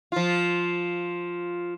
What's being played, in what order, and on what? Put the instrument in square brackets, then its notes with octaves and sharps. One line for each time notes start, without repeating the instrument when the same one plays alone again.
[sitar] F3 F4